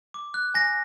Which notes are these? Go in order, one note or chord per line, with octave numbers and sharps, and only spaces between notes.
D6
F#6
G#5 A#6